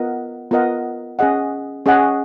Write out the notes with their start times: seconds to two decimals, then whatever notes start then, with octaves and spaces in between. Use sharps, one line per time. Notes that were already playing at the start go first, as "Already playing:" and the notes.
Already playing: B3 F4 A#4 D#5 F#5
0.51 B3 F4 A#4 D#5 F#5
1.19 C#4 G#4 D#5 F#5
1.86 C#4 G#4 D#5 F#5